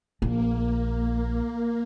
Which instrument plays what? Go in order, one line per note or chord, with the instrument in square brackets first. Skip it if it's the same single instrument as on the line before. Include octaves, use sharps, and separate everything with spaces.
[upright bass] A#1 D4 [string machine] A#3